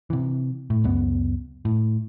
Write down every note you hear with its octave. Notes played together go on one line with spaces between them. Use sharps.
C3 E3
A2
C#2 F#2 B3
A2